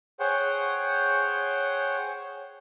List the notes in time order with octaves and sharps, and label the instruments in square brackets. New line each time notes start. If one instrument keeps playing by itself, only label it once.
[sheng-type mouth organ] G#4 C5 C#5 F#5 G5